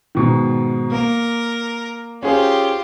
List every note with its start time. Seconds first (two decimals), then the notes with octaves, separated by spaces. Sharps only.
0.15 G#2 B2 D#3
0.92 A#3 A#4
2.23 C#4 F4 G4 G#4 C5